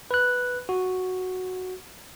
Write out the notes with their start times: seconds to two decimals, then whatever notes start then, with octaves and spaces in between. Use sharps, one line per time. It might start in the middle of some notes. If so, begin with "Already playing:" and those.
0.11 B4 F#6
0.69 F#4